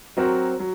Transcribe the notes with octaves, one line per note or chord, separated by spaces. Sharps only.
F#3 C4 F#4 A#4
F#3